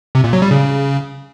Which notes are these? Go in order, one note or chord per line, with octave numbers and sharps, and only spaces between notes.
C3
A#2
F#3
G3
C#3